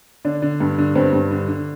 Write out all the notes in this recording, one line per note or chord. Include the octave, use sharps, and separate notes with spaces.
D3 D4
D3
G2
D3
G2 C4
G2
D3
D3